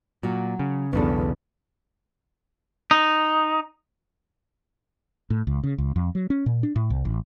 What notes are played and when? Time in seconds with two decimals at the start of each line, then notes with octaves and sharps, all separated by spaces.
0.23 A#2 F#3 F#4
0.59 C#3
0.93 B1 E2 C#3 B3 C#4 D4 A4
2.91 D#4
5.30 A2
5.47 C#2
5.64 C#3
5.78 C#2
5.96 F2
6.15 F#3
6.30 C#4
6.46 A#2
6.63 D4
6.76 A2
6.90 C2
7.05 A1